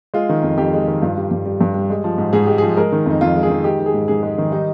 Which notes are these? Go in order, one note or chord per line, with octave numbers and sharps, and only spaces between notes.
G#3 F4
D#3
F2
F2 G4
G#3
D#3
G2 F4
G3
G2
G3
G2
G3
G#3
F3
G#2
G#2 G#4
G#3 G4
F3 G#4
G#3 A#4
D#3
F2 D#4
F2 F4
G#3
G#4
D#3
G#3 G4
D#3
G#4
G#2
G#2 G#4
G#3
D#3
G3 D#4